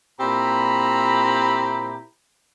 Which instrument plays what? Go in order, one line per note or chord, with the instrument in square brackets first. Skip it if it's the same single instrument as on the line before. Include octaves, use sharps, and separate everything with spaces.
[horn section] A#2 C4 E4 G4 A#5 B5